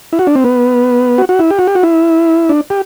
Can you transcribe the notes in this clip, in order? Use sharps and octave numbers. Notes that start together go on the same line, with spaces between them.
E4
F#4
D4
C4
B3
F#4
F#4
E4
G4
F#4
G4
F#4
E4
D4
G4